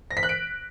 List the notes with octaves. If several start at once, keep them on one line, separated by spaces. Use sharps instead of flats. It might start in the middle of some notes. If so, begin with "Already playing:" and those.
A#6
B6
F#6
D7